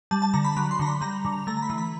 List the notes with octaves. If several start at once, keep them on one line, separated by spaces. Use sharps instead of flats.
G3 A5
A5
D3 A#5
B5
F#3 B5
C6
D3 A#5
B5
G3 A#5
D3
A3 A#5
A#5
B5
E3 A#5
B5